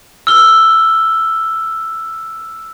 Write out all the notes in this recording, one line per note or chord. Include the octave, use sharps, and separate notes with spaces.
E6 F6 G7